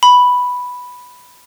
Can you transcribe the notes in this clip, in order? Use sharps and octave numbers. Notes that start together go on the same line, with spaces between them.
B5